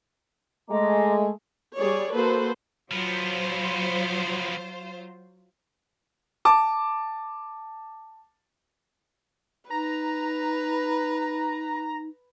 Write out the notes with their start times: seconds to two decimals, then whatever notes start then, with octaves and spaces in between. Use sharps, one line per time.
0.70 G#3 A3 D#5 A#5 D6
1.76 G3 G#4 C#5 D5
2.12 A#3 F#4 A4 B4 C5
2.91 F3 F#3 B3 F4 C5
6.45 A5 D6
9.70 D#4 B4 A#5